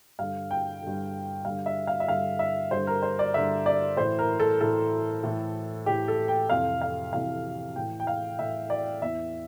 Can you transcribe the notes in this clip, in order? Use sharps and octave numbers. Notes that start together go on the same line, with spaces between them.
G2 D3 F5
G5
G2 D3
G2 D3 F5
E5
F5
E5
G2 D3 F5
E5
G2 D3 C5
A#4
C5
D5
G2 D3 E5
D5
A2 E3 C5
A#4
A4
A2 E3 A4
A2 E3
A2 E3 G4
A4
G5
F2 C3 E3 F5
F5
F2 C3 E3 F5
A2 E3 G5
G5
F5
A2 E3 E5
D5
E2 E3 E5